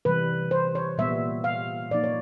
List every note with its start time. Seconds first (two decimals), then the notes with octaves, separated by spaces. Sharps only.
0.05 C3 E3 G3 B4
0.51 C5
0.75 C#5
0.98 A#2 G3 B3 E5
1.44 F5
1.91 A#2 F3 A#3 D#4 D5
2.04 C#5